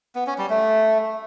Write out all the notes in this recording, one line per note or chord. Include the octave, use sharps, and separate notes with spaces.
B3
C#4
G3
A3